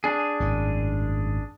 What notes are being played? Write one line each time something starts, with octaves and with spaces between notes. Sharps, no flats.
D4 G#4
G#1 F#2 A2